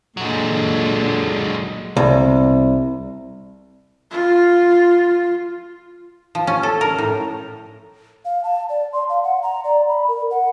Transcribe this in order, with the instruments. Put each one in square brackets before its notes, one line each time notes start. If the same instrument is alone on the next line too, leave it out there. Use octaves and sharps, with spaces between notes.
[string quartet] A#2 D3 [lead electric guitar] F#3 G#3
[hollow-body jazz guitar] C2
[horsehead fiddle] F4
[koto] F3
C#4
A4
A#4
A2
[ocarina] F5
A5
D5
C6
F5
F#5
A#5
D5
B5
A#4
F#5